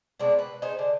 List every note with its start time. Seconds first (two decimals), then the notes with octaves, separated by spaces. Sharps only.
0.20 B2 G#3 C4 D4
0.39 B4
0.62 D#4 G#4 C5
0.79 D3